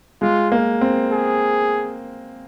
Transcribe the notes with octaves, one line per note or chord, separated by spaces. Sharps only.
G#3 F4
A#3
C4
G#4